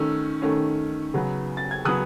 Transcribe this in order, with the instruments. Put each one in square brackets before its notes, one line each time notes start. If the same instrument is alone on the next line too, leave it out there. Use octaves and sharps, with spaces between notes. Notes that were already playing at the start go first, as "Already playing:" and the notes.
Already playing: [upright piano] D#3 A3 C#4 E6
D#3 A3 C#4
C#3 F#3 B3
A6
G#6
C#3 F#3 B3 D#6 F#6